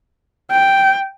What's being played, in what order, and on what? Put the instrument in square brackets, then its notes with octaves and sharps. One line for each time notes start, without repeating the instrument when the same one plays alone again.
[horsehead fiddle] G5